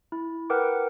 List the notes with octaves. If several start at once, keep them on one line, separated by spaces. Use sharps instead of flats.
E4
A#4 B4 F#5 G5 D6